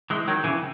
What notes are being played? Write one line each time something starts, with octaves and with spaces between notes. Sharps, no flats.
E3 G#3
D#3 F#3
C#3 E3